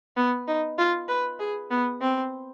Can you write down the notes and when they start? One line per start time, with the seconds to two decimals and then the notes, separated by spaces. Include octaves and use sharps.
0.16 B3
0.47 D#4
0.78 F4
1.08 B4
1.39 G#4
1.71 B3
2.01 C4